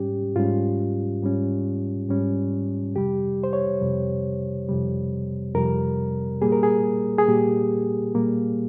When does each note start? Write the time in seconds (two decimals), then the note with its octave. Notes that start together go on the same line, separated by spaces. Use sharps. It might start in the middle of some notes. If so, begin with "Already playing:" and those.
Already playing: G#2 G3 C#4 G4
0.36 G#2 G3 C#4 F4
1.23 G#2 G3 C#4
2.09 G#2 G3 C#4
2.96 F2 C3 G3 G4
3.44 C5
3.53 C#5
3.81 F2 C3 G3
4.68 F2 C3 G3
5.55 F2 C3 G3 A#4
6.42 A#2 G3 A#3 G#4
6.52 A#4
6.63 G#4
7.18 G#4
7.28 A#2 G3 A#3 G4
8.15 A#2 G3 A#3